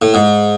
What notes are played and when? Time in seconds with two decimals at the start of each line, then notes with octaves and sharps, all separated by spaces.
0.02 A2
0.14 G#2